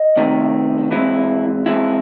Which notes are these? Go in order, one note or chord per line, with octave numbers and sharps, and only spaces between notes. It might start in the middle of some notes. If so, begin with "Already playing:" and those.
Already playing: D#5
C2 C3 D#3 A3
G#2 E3 G#3 C4 E4
G#2 E3 G#3 C4 E4